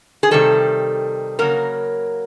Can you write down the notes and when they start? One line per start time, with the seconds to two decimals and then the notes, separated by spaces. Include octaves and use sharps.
0.23 G#4
0.31 C3 D#3 G3 A4
1.39 C#3 F#3 A#3 A#4